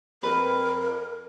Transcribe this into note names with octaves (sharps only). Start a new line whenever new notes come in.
F2 A#4 B4